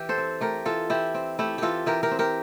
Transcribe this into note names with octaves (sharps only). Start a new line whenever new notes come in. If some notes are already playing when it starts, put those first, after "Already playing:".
Already playing: E3 G4
A4 C5
C4
A3 G4 A#4
E3 F4 A4
E3 E4 G4
C4
A3 E4 G4
E3 F4 G4 A4
E3 G4 A#4
G4 A#4
C4
G4 A#4